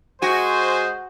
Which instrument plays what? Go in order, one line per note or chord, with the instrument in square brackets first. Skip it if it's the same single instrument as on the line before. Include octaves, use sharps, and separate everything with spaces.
[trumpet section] G#3 C5 [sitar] F#4 [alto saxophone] G#5